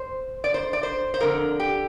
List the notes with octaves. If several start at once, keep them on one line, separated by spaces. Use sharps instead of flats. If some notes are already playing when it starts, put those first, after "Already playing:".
Already playing: C5
D5
C5
D5
C5
C5
F2 D3 A#4
G4